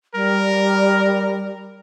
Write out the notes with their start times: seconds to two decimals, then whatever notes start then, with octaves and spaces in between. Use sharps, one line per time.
0.15 G3 A#4